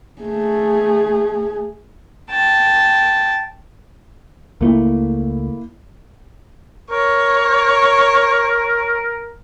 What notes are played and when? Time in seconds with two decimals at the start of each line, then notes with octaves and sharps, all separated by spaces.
0.22 A3 G#4
2.30 G5 A5
4.61 C#2 A3 A#3 E4
6.91 A#4 C#5